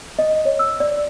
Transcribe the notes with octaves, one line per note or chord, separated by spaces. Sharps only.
D#5
C#5
E6
D5